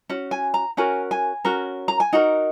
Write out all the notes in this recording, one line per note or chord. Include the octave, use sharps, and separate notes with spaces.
C#4 F#4
G#5
A#5
C#4 F#4 A#4 G#5
G#5
C#4 F#4 A#4
A#5
G#5
D#4 F#4 A#4 F#5